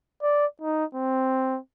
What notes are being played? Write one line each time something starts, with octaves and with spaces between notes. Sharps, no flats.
D5
D#4
C4